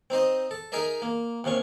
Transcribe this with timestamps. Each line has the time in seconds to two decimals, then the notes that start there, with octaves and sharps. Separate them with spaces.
0.10 C4 D#4 C5 D#5
0.51 A4
0.72 D#4 G#4 A#4 D#5 E5
1.02 A#3
1.44 D#2 C3 C#4 C#6